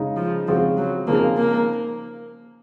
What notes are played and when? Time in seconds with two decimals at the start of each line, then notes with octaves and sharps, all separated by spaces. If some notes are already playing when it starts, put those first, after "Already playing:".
Already playing: C#3 G#3 D#4
0.17 F3
0.48 C#3 F3 G#3 C4 F#4
0.77 F#3
1.07 C#3 F3 A#3 C4 D#4 G#4
1.37 A#3